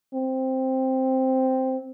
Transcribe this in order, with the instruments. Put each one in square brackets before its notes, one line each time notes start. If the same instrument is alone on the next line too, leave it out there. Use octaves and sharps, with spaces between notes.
[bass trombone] C4